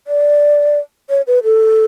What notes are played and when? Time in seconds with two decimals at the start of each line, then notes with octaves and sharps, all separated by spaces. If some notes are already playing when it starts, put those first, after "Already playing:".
0.07 D5
1.10 C#5
1.27 B4
1.44 A4